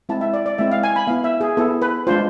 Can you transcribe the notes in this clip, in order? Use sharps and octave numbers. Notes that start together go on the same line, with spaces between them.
G#3 C4 E4 A5
E5
D5
D5
G#3 C4 E4 E5
F5
G#5
B5
B3 E4 F5
E5
G#4
B3 E4 A4
B4
G#3 D4 F4 C5